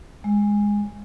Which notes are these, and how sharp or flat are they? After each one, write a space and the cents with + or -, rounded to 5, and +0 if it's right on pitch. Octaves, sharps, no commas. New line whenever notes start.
G#3 -15